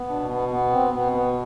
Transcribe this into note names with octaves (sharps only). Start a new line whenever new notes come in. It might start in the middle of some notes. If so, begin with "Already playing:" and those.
Already playing: B3
B2 D4
B3
B3
C4
B2 B3
B3